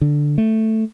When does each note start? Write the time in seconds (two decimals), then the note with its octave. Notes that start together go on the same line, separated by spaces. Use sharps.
0.01 D3
0.38 A3